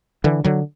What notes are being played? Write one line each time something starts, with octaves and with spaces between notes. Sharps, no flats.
D3 E3
D3 F#3